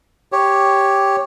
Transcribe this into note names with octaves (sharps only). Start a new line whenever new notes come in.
G4 C#5